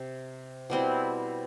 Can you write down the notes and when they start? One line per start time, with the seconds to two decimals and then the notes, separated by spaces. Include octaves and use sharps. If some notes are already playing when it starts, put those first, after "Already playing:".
Already playing: C3
0.70 B2 G3 C4 E4